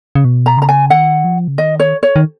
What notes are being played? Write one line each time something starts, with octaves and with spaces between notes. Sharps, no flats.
C#3
B2
A#5
C#3 A#5
G#5
D#3 F#5
F3
C#3
D#3 D#5
C#5
C#5
D#3